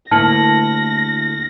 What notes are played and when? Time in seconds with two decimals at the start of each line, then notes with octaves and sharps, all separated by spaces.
0.11 D2 A#3 E4 A5 F6 A#6 C#7 F#7